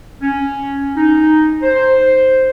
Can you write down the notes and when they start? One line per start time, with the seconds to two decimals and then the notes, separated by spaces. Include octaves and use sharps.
0.21 C#4
0.96 D#4
1.63 C5